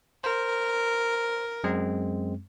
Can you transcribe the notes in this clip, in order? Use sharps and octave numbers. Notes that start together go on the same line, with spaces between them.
A#4 C5
F#2 G#3 C4